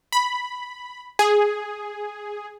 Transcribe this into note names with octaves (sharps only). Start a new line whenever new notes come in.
B5
G#4